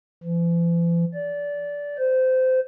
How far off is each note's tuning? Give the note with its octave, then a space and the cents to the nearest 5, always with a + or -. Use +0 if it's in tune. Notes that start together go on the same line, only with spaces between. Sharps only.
E3 +45
D5 -20
C5 -20